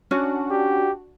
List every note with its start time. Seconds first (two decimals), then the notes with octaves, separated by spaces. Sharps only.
0.11 C#4 D4 F#4
0.51 G4